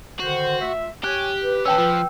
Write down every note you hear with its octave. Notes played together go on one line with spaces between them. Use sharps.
D3 D#3 F#4 C5
A3 F4 E5
G4 C#5 G#5 F#6
B4
C#4 A4 G5 E6
F3